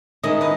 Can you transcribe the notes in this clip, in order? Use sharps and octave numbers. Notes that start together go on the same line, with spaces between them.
D#3 G#3 C#4 E4 D#5
B4 D#5